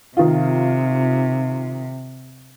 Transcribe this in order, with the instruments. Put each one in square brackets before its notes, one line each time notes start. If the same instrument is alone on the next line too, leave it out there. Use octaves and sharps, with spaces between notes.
[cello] C3 [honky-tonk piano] D#3 F4